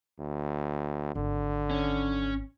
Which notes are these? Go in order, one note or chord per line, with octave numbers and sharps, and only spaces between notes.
D2
G#1 D3
C#4